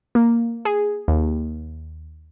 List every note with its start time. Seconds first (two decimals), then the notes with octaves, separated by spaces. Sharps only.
0.15 A#3
0.65 G#4
1.08 D#2